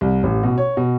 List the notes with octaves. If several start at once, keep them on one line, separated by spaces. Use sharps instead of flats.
C2
A1
B2
C#5
B2